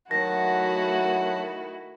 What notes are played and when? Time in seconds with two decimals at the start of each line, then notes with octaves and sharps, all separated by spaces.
0.11 D#3 F#3 A3 E4 F#4 F#5 A5 A#6